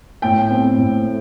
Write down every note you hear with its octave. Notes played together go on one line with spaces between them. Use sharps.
A2 G5
C4
A2
A3